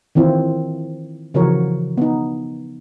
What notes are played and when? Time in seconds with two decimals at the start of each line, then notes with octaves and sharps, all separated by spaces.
0.15 D#3 E3 C4 E4 F4
1.34 C#3 E3 F3 F#4 A#4 C#5
1.98 B3 D#4